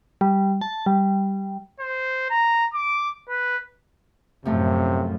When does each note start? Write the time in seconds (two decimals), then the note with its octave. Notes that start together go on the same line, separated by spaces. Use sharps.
0.21 G3
0.61 A5
0.86 G3
1.80 C5
2.30 A#5
2.74 D6
3.28 B4
4.45 F#2 A2 C3 F3 A3